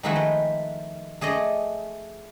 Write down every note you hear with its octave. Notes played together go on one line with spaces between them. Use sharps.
D#3 F3 G#3 A3 E4 F#4
B4 G5
A3 G#4 D5 D#5